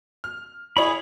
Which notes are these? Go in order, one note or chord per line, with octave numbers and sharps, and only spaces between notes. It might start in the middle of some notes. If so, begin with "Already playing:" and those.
F6
E4 G#4 C#5 B5